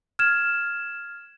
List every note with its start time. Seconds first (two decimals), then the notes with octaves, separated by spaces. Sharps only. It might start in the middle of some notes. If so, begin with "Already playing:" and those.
0.19 F6 G#6 E7